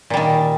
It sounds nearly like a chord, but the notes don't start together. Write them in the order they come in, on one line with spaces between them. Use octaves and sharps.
A#2 G3 D#3